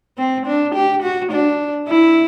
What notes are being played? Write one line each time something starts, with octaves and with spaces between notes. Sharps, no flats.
C4
D4
G4
F#4
D4
E4